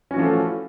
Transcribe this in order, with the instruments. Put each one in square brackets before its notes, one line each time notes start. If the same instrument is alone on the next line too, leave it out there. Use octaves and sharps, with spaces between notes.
[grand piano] C#4
F#4
E3
F3
A3